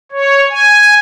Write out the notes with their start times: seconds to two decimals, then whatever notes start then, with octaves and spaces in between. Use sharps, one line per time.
0.12 C#5
0.50 G#5